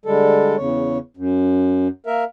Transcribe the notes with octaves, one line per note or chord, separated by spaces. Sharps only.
D3 G3 G#3 A4
E2 C#3 C#5
F#2
A#3 A#4 E5